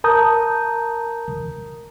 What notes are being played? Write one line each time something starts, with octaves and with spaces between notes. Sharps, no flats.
A#4 A5 A#5 D#6 G6